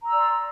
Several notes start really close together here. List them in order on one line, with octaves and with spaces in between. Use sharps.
A#5 E6 D5 C6